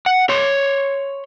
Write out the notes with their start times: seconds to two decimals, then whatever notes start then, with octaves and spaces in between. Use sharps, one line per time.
0.06 F#5
0.29 C#5 C6